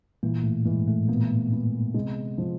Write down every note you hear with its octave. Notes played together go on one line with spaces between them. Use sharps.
A#2 E3 A#3
A2 A3
G#2 E3 G#3
A2 A3
A#2 A#3 B3
B3
C3 G#3 C4
F3